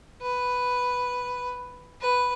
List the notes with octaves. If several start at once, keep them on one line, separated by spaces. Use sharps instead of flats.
B4
B4